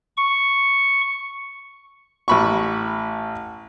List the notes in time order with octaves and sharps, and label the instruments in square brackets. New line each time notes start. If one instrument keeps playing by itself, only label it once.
[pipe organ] C#6
[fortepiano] A1 B5 C#6